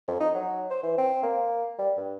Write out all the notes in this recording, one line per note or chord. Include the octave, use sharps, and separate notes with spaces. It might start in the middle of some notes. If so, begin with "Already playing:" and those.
F2
D#4
F#3
C5
E3
C4
A#3
G3
G2